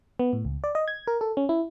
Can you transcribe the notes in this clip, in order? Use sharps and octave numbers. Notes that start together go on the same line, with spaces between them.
B3
A2
C#2
D5
D#5
G#6
A#4
A4
C#4
E4